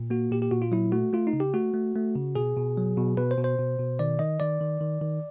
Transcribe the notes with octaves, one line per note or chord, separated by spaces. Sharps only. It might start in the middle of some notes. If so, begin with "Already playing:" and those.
Already playing: A#2
A#3 F#4
A#2 G4
G4
A#2 F#4
F4
F#3 E4
A3 F#4
A3 F4
D#4
C#3
G4
A3 F#4
A3
A3
C#3
B2 G#4
B2
F#3
B2
B2 B4
C5
B2
C5
B2
B2
D#3 D5
D#3 D#5
D#3 D5
D#3
D#3
D#3